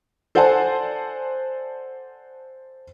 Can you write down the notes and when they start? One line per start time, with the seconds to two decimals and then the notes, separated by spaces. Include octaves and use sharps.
0.35 A4 C5 D5 F#5 G#5 A5